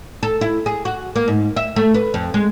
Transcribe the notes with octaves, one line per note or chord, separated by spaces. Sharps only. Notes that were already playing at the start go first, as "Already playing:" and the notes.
A4
E4
G#4
F#4
A#3
G#2
E5
A3
B4
F2
G#3